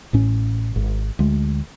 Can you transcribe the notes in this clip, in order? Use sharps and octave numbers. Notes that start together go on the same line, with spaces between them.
A1 A2 C#4
G#1
D2 G#3